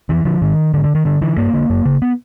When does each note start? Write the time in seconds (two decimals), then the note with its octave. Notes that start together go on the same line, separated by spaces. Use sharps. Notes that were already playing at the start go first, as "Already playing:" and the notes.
0.09 F2 E3
0.25 D3 F3
0.42 G#2 D#3
0.73 G#2 D3
0.84 D3
0.95 D#3
1.05 G2 D3
1.21 D3 E3
1.37 G2 A#3
1.54 D3
1.70 F#2
1.85 C#3
2.02 B3